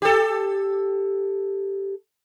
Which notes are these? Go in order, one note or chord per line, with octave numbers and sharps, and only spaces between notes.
G4 A4